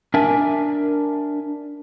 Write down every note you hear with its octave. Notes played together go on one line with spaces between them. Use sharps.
D4 A#4 E5 G#5